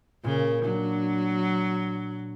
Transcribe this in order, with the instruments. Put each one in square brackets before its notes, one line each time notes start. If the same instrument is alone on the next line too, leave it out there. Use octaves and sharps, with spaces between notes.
[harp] A#2 [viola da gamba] C#3
[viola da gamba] F#3 [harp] D4